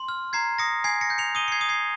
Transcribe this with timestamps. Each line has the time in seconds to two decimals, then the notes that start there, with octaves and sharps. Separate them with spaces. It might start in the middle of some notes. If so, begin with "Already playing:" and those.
Already playing: C6
0.08 F6
0.33 A#5 G#6 C7
0.59 D#6 A#6 C#7
0.84 G#5 G#6 C7
1.01 A#6 C#7
1.10 G6
1.18 C#7 F7
1.35 D#6 D#7 G7
1.48 C#7
1.52 G#6 C7
1.61 D#6
1.69 G#6 C7